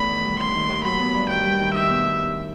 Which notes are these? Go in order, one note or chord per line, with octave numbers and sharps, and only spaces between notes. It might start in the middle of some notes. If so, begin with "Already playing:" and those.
Already playing: E2 B2 A3 B5
D#3
G3
D#2 C6
D#3
D#2
F#3 B5
B3
G2
D#3 G5
G3
D#3
D#4 E5
B2